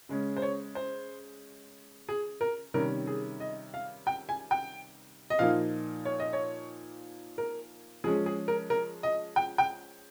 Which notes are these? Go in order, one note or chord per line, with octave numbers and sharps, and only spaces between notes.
C#3 G#3 C#4
C5
C#5
C5
G#4
A#4
C3 D#3 G3 C#4 A#4
G#4
D#5
F5
G5
G#5
G5
D#5
A#2 F3 A#3 D#4 F5
C#5
D#5
C#5
A#4
F3 G#3 C#4 G#4
G#4
A#4
A#4
D#5
G5
G5